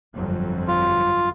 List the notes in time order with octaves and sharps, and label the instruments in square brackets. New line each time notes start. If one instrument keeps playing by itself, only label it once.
[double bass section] G1 F2 F#3
[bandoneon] F4